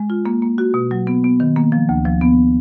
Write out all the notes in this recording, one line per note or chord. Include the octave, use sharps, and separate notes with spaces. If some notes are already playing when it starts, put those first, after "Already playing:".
Already playing: G#3
F4
A#3
A#3
F#4
B2
F#3
B3
B3
D#3
A#3
F3
D2
F3
B3